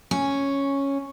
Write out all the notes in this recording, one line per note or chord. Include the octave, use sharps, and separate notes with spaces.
C#4